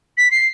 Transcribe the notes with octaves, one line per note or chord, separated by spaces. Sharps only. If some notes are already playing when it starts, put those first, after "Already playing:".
B6
C7